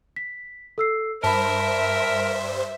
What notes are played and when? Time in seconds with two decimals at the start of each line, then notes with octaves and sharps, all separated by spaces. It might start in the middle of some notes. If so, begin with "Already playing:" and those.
0.16 B6
0.78 A4 E6 C7
1.23 G2 A#4 C5 E5 A5 B5